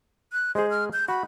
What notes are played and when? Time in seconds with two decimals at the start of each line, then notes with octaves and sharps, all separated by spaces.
0.33 F#6
0.55 G#3 G#4 C5
0.70 F6
0.93 G6
1.08 F#4 B5